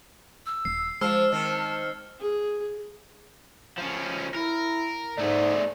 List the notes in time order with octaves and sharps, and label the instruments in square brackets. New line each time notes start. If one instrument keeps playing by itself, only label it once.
[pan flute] E6
[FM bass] D#1 [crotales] C7
[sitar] F3 C5 [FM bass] G#3 [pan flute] A5 [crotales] E6 F6
[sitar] D#3 C4
[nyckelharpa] G#4
[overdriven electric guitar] F3 C#4
[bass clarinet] E4 [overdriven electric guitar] A#4
[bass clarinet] G#2 [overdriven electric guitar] A3 G#4 [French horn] D5